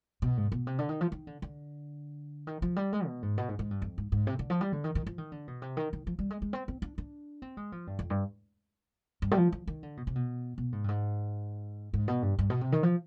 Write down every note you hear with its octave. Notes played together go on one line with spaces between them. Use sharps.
B2
G#2
B2
C3
D3
D#3
F3
D#3
D3
D3
D#3
F3
G3
G#3
B2
G#2
B2
G#2
G#2
G2
F2
G#2
G#2
C3
D3
F3
G3
D3
D#3
D#3
F3
D#3
D3
B2
C3
D#3
D#3
F3
G3
G#3
G#3
C4
C4
D4
D4
C4
G#3
F3
G2
F2
G2
G2
G3
F3
F3
D#3
D3
B2
C3
B2
B2
G#2
G2
G#2
G#2
B2
G2
G2
B2
C3
D#3
F3